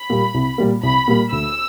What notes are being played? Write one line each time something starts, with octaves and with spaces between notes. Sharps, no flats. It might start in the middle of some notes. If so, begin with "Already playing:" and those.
Already playing: B5
A#2 G3 A#3
C2
A#2 G3 A#3
C2 B5
A#2 G3 A#3
D2 E6